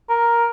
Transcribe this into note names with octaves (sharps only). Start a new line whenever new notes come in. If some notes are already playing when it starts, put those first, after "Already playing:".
A#4